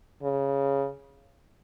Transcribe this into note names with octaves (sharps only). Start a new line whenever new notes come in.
C#3